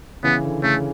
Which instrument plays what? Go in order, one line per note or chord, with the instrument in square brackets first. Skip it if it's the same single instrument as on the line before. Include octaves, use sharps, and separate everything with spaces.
[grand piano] C#3 E3 [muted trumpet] B3
[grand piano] D3
[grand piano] C#3 [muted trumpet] A3